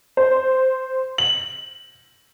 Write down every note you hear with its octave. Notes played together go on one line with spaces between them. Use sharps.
C5
F#7